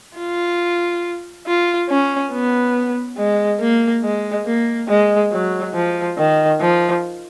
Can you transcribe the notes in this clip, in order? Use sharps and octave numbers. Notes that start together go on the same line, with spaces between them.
F4
F4
C#4
B3
G#3
A#3
G#3
A#3
G#3
F#3
F3
D#3
F3